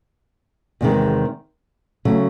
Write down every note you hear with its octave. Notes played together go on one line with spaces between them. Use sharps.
E2 C3 D#3 G#3
C#3 F#3 A3